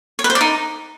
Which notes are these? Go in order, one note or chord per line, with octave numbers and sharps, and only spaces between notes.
C#5
B4
C5
D5
D#4